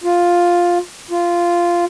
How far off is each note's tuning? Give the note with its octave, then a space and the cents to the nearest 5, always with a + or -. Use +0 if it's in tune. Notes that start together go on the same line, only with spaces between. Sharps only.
F4 +5
F4 -10